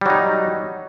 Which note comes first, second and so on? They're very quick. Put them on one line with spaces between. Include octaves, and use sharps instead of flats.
G3 F#3 D#4